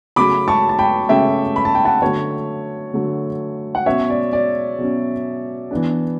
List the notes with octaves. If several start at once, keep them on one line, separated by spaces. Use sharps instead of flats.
C#3 F#3 A3 C#4 B5 D6
A5 C#6
A5
G5 B5
C#3 F#3 A3 C#4 E5 G5
B5
A5
G5
F#5 A5
D3 F#3 A3 C#5
D3 F#3 A3
F#5
B2 F#3 C#4 C#5 E5
D5
D5
B2 F#3 C#4
E3 B3 D4